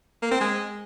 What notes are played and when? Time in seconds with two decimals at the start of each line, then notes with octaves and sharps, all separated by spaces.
0.22 A#3
0.31 C4
0.41 G#3